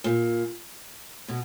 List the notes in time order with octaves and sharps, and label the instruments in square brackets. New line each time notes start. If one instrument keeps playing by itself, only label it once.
[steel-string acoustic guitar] A#2
B2